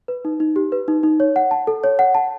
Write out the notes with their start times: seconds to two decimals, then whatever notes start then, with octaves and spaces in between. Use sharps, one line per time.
0.08 B4
0.25 D#4
0.40 D#4
0.56 G4
0.72 B4
0.88 D#4
1.03 D#4
1.20 C#5
1.36 F#5
1.51 A5
1.67 A4
1.84 C#5
1.99 F#5
2.15 A5